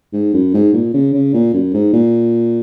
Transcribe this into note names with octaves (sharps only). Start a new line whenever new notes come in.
G#2
F#2
G#2
A#2
C#3
C#3
A#2
F#2
G#2
A#2